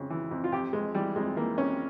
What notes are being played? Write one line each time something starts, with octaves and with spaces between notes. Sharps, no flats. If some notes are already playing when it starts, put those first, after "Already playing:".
Already playing: F2 C#3
E3
F2
F4
F2 G4
F2 G#3
E3 G3
F2 G#3
E3 A#3
F2 C#4